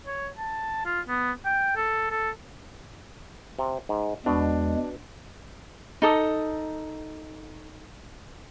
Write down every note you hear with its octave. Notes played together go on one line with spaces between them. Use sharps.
C#5
A5
F4
B3
G5
A4
A4
C3
G#2
E2 B2 G#3 D4
D#4 A4 D#6